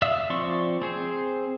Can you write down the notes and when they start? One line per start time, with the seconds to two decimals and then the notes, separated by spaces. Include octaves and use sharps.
0.02 D5 E5 F5 D#6 E6
0.30 F3 C4 D5 C6 C#6
0.82 C4 G#4 C5